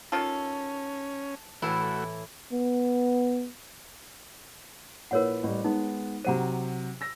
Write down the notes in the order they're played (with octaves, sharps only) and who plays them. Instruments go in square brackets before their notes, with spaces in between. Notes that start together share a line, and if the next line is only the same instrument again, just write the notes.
[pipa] D#3 F4 A4 [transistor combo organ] C#4
[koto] A2 E3 E4 [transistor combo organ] A3 F#4
[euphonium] B3
[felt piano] A#1 E4 B4 [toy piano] A#4 C#5 F#5
[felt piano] A1 G3
[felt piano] G#3 B3 [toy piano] D#4
[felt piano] C3 F#3 D#7 [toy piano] C5 F#5 A#5
[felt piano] E6 A#6